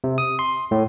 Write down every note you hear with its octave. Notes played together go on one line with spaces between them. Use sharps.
C3
D#6
C6
A2